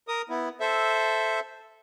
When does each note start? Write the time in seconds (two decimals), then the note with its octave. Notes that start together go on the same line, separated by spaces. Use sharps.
0.08 A#4 D#6
0.29 B3 E4
0.60 A4 C5 E5